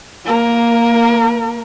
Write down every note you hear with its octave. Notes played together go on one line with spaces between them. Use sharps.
A#3 A#4